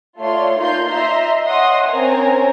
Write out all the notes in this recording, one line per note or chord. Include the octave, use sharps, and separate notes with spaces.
A3 F4 C#5 D5 C6
A#3 D#4 F4 C6 G6
D#5 E5 A#5 C6
C#5 D#5 E5 F#5 C6 D#6
C4 C#4 A#4 C5 G#5 A#5